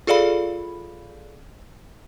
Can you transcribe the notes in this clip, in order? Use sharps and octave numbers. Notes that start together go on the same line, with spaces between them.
F4 G#4 A4 D5 F5 B5